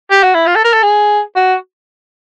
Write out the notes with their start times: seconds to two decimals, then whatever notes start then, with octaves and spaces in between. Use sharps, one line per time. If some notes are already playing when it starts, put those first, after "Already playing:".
0.11 G4
0.23 F#4
0.34 E4
0.47 F4
0.56 A4
0.64 A#4
0.73 A4
0.83 G#4
1.36 F#4